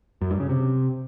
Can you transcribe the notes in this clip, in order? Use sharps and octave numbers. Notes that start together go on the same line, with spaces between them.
F#2
G2
C#3
C3